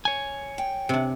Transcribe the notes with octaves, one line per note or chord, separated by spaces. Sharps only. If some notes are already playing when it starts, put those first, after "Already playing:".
C#5 G#5
G5
C3 D4